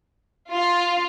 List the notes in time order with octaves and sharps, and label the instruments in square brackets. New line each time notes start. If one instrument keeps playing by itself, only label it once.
[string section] F4